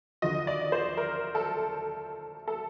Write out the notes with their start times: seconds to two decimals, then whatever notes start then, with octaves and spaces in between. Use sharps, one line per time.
0.22 D#2 D3 F3 D#5
0.47 D5
0.72 C5
0.97 A#4
1.35 A4
2.48 A4